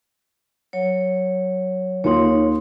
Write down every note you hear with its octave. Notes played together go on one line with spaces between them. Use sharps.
F#3 C#5
D#2 D#4 F4 C#5 C6